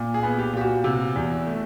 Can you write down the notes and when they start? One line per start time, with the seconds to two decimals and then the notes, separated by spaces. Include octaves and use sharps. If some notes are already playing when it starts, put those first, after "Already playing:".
Already playing: A#2
0.14 G#4
0.23 B3
0.38 G4
0.53 A#2 G4
0.61 F#4
0.84 C3
1.16 E2
1.47 A3